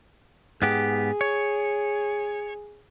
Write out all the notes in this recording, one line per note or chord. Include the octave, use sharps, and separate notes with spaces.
G#2 B3 G4 G#4
C#5